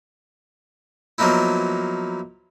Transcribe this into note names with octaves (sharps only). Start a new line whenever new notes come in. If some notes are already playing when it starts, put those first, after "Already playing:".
F3 F#3 A#3 B3 D#4 E4